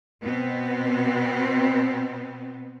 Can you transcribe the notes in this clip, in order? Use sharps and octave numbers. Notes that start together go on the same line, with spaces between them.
B2 B3 C4